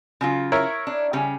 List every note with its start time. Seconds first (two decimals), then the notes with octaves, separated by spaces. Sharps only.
0.21 C#3 F#3 F4
0.52 E4 A#4 C#5
0.87 D4
1.13 C#3 G3 C#4